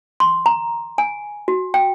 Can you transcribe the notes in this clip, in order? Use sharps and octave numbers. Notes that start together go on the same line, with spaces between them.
C6
A#5
G#5
F#4
G5